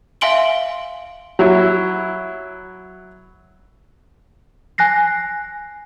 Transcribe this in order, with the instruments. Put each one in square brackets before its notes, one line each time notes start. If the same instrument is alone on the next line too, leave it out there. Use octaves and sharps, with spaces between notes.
[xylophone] E5 F5 G#5 C6 D7 G7
[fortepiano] F#3 E4
[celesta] G#5 F#6 A#6 C7